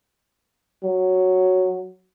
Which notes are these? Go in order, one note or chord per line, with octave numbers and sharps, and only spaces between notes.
F#3